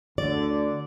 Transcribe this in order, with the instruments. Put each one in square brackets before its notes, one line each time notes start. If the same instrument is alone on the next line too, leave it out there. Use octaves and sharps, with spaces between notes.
[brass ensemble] D2 D3 [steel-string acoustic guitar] D5